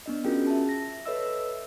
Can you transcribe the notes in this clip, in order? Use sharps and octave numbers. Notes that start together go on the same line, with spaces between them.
B3 D4 D#5
C#4 F4 F#4 G#4 A#4 G5
E5 A5
A#6
A4 B4 C#5 D#5 E5 E6